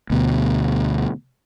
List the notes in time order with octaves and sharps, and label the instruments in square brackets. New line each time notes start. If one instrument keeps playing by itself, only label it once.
[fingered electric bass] D2 B2